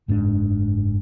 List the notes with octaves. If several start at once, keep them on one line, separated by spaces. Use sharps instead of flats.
F#1 G#2 C#3 D4